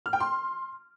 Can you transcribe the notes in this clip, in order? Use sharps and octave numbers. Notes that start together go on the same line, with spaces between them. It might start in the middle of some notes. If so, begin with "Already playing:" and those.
F6
G5
C6